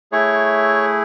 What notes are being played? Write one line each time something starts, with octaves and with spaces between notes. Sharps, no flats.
A3 E4 G#4 C#5 C#6